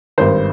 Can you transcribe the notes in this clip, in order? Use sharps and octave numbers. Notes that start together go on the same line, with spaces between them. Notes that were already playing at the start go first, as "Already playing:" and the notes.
G#1 G2 D#3 C5